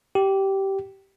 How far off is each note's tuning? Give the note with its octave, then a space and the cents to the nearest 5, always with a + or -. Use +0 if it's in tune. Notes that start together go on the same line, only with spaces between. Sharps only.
G4 -15